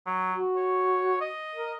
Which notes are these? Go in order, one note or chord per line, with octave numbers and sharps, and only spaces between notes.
F#3
F#4
C#5
D#5
A#4